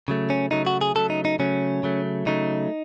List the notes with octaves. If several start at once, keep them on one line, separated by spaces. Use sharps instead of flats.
C#3 F#3 A3
C#4
C#3 F#3 A3 D#4
F#4
G#4
C#3 F#3 A3 A4
D#4
D#4
C#3 F#3 A3 C#4
C#3 F#3 A3
C#3 F#3 A3 D#4